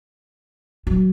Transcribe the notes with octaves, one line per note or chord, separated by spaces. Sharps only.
F#3